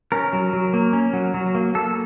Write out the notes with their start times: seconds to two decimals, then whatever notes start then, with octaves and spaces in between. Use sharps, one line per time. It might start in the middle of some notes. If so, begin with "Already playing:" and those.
0.12 C#4 A#4
0.33 F#3
0.53 F#3
0.73 A#3
0.93 C#4
1.13 F#3
1.34 F#3
1.55 A#3
1.75 A#3 A4